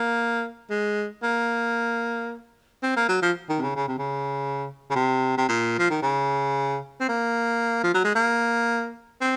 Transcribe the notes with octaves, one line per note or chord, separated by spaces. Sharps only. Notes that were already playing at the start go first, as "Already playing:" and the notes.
Already playing: A#3
G#3
A#3
C4
A#3
F#3
F3
D#3
C3
C#3
C#3
C3
C#3
C#3
C3
C3
A#2
F3
D#3
C#3
C4
A#3
F3
F#3
G#3
A#3
C4